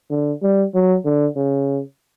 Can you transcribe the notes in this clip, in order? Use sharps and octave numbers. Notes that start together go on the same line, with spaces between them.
D3
G3
F#3
D3
C#3